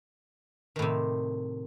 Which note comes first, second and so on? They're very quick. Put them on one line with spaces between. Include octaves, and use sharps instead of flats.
D#3 A2 C3